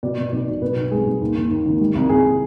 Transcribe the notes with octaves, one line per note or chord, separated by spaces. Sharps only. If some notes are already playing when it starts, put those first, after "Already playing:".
B2 D5
B2
B1 D5
B2
B1 B4
B1
G3 G#4
B1
D#2
D#2
D#2
D#3
G3
C2
C2 G#4